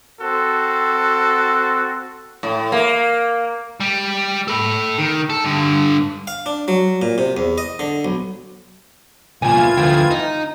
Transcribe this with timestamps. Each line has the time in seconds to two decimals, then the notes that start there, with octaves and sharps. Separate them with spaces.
0.20 C4 F#4 A4
2.43 A2
2.72 A#3
3.80 G3
4.48 A4 B5
4.98 D#3
5.30 A4
5.45 G2 D3
6.27 F5
6.46 D4
6.68 F#3
7.02 A#2
7.18 C3
7.37 E2
7.58 D#5
7.79 D3
8.05 B1
9.42 C2 A#2 E3 F4 G#5 G#6
9.77 D2 F3 G5
10.10 D#4